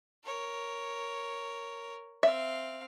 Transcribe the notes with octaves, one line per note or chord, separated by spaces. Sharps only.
A#4 C#5
C4 E5 F5